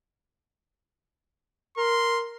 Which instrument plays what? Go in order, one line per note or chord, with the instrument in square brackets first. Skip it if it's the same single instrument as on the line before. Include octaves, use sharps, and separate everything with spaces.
[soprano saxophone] A#4 [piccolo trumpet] C6